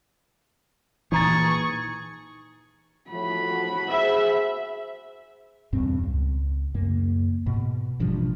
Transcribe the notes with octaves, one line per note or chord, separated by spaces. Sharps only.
A#2 E3 D#4 G#4 A#5 C#6 A6
A2 F3 F#4 B5
G#4 C5 E5
E2 G2 B2 C4
C#2
F#2 C#3 A#3
G#2 B2
A1 G2 B2 F3